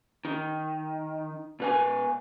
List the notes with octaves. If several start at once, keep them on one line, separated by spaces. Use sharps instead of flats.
D#3
B2 B4 G#5